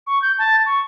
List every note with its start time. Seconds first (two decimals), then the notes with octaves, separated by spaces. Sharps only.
0.07 C#6
0.22 G6
0.39 A5
0.66 C#6